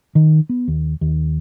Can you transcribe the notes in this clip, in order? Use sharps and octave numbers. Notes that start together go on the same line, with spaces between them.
D#3
B3
D#2
D#2